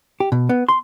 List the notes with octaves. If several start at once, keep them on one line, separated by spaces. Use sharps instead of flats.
G4
B2
B3
C6